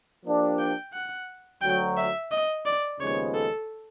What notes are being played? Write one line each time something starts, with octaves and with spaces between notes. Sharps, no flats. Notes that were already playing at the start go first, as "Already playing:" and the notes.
F3 A#3 D4 G4
G5
F#5
D2 D3 F#3 G5
E5
D#5
D5
D#2 C#3 F3 G#3 B3 C#5
A4